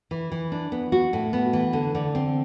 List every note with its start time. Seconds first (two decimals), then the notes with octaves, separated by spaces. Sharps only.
0.11 E3
0.32 E3
0.52 D4
0.72 B3
0.92 F#4
1.13 A2
1.33 B3
1.53 E3
1.73 D3
1.95 D3
2.15 C4